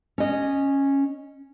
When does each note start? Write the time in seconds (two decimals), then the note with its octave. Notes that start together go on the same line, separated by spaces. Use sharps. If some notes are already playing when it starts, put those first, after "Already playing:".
0.18 C#4 D#5